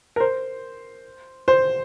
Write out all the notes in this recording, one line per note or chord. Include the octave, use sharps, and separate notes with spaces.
A#4
C5
C5